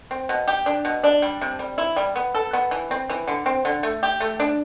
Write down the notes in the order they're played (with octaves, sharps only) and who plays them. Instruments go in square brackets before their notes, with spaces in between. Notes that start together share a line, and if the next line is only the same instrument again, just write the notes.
[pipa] C4
B2
G4
D4
B2
D4
G3
C3
G3
E4
G3
B3
A4
B3
E3
C4
E3
D3
C4
D3
A3
G4
A3
D4